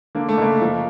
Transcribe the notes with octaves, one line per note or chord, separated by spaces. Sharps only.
D3 A#3
A3
F#1 A#3
F3